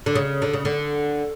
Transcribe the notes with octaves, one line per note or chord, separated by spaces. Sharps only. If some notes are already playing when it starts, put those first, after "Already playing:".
D3
C#3
D3
C#3
D3